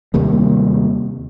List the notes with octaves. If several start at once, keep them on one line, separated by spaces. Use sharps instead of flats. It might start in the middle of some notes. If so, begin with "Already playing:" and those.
D#2 C3 G3 A#3